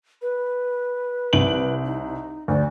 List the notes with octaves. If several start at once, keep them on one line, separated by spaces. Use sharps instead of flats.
B4
C2 D7 F#7
D#4
D2 D5